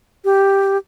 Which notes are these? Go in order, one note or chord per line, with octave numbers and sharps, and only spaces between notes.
G4